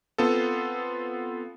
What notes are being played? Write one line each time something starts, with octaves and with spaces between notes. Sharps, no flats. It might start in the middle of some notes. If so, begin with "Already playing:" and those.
B3 C4 F4 A4